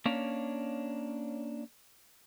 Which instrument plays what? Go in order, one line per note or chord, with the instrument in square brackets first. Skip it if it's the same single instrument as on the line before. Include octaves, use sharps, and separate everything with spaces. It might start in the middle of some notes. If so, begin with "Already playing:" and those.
[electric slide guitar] A#3 C#4 D4 C#5 F5